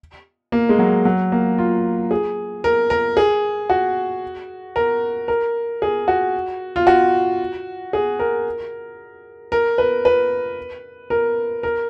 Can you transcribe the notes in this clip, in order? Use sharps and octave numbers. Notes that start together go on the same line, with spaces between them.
A#3
G#3
F#3
F#3
A#3
F4
G#4
A#4
A#4
G#4
F#4
A#4
A#4
G#4
F#4
F4
F#4
G#4
A#4
A#4
B4
B4
A#4
A#4